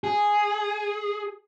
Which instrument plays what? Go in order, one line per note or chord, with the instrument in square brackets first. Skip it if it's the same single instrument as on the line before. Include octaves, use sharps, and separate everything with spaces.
[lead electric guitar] G#4